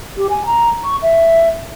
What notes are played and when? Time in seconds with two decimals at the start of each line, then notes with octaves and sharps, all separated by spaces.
0.17 G4
0.29 G#5
0.46 A#5
0.84 C#6
1.02 E5